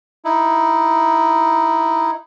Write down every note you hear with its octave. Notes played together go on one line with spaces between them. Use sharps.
D#4 E4